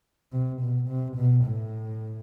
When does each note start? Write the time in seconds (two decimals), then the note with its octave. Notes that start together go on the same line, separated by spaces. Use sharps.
0.32 C3
0.61 B2
0.88 C3
1.16 B2
1.45 A2